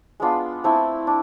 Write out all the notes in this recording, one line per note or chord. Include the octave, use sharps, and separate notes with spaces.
G#3 B3 D4 F4
A3 C4 E4
D4